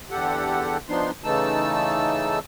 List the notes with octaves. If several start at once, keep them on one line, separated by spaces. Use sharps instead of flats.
E2 D3 G4 A4 F#5
F3 B3 D4 D#4 C6
C#3 E3 A3 D#4 A5 E6